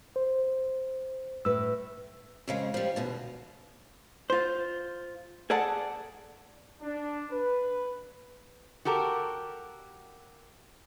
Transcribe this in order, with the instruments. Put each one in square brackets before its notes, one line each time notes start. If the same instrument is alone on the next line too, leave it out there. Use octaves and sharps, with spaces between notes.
[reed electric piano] C5
[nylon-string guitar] A2 B4 [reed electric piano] E6
[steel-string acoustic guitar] F2 C#3 G#3
F3 G3
E2 B2 D3
[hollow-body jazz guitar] F4 C5
G#4 A4 D5 F#5 A5
[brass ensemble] D4
B4
[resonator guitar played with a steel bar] F#4 G4 A4 A#4